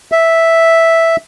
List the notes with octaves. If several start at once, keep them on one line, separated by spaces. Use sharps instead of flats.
E5